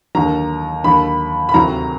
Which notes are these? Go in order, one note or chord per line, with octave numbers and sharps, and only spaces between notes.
D#2 D3 F#3 A#5
D#2 D3 F#3 B5
B5
D2 C3 D#3 F#3 A#5